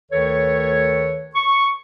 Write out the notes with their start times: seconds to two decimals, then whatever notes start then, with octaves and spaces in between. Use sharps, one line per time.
0.11 D2 D#3 A4 B4 C#5
1.35 C#6